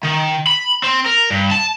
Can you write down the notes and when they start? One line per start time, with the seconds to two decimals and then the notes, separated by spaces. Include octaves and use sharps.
0.03 D#3
0.47 B5
0.84 C4
1.06 A#4
1.30 G2
1.51 A5